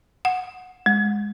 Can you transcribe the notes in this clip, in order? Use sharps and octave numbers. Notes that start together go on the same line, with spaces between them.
F#5
G#3